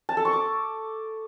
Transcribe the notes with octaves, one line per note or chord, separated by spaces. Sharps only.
A5
A4
C#6
D6